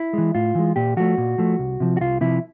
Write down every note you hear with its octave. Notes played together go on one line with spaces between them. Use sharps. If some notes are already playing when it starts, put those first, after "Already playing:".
Already playing: E4
E3 G#3
A2 F4
E3 G#3
A#2 G4
F3 A3 F#4
A#2
F3 A3
C2
C3 F3
F#4
C2 F4
C3 F3 E4